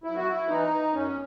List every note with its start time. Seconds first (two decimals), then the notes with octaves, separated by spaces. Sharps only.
0.04 F#2 E4
0.16 F#4
0.29 E4
0.48 E3 D#4
0.93 F#2 C#4